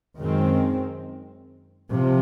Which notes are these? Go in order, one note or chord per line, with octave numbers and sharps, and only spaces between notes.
F#2 D#3 G#3 C4
C3 F3